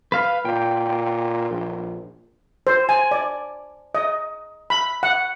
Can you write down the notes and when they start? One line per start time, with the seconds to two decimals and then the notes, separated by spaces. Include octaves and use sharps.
0.12 B4 F5 F6
0.45 A#2 G5
1.51 A#1
2.67 C5
2.89 G#5
3.11 D5
3.95 D#5
4.70 B5
5.03 F#5